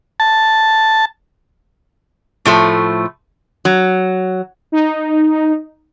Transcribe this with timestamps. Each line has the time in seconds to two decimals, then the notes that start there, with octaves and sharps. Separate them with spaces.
0.20 A5
2.45 A2 F3 A3
3.65 F#3
4.72 D#4